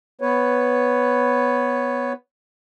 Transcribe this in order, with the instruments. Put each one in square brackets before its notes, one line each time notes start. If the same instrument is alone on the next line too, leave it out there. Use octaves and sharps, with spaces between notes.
[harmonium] B3 B4 C#5